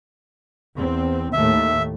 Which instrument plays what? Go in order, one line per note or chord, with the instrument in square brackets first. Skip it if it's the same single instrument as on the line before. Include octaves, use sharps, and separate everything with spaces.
[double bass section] E2 C4
[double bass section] D#2 A2 A3 [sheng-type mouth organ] E5